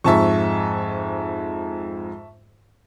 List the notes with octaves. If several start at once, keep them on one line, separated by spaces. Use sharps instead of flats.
F2 G#2 E5 A5 C#6